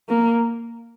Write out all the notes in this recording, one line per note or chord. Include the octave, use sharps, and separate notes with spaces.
A#3